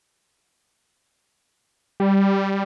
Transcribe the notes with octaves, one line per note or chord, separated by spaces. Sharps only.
G3